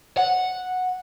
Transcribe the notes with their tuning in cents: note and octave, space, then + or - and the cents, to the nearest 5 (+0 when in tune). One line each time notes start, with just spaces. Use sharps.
F#5 -5